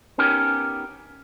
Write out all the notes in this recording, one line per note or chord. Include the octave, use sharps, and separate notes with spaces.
B3 C#4 D#4 G4 A#4 C#5